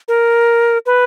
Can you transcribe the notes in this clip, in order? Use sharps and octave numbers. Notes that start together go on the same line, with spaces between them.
A#4
B4